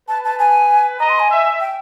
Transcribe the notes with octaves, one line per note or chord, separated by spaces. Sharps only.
B4 A5
A5
G#5
D#5 A#5
C6
G#5
E5
G5